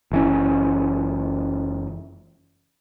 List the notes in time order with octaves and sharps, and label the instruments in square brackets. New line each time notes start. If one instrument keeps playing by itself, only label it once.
[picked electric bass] F#1 E3 C#4